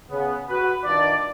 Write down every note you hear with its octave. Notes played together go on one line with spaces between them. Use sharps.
C#3 B3
F#4 B4
G2 D#3 D4 F4 D5